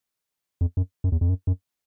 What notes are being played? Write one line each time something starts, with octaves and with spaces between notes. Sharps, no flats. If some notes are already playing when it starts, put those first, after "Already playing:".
F2
F#2
F#2
E2
F2
F#2
F#2